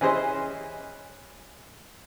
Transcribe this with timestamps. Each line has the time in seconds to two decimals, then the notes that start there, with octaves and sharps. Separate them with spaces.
0.01 E3 C#4 G#4 C5 D#5